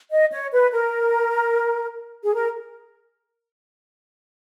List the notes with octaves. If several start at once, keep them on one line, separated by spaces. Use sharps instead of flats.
D#5
C#5
B4
A#4
G#4
A#4